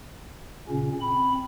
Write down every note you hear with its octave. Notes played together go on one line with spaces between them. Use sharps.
A#2 C#3 C#4
C4 B5